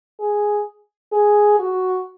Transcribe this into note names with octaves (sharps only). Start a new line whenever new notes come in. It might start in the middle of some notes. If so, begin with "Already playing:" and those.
G#4
G#4
F#4